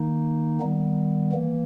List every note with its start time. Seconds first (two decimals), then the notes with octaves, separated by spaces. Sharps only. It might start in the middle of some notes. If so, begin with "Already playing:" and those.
Already playing: D#3 A#3 D#4
0.60 D#3 G3 B3
1.32 E3 A#3